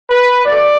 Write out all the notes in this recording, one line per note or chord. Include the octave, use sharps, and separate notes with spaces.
B4
B2 A3 D5